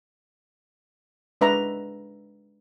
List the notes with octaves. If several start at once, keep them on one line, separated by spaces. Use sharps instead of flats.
G#3 D4 B4 E5 A#5